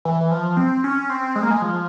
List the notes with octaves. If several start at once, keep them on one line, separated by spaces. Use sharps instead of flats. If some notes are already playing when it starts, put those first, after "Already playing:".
E3
E3
F3
C4
C#4
C4
G#3
A#3
G#3
F3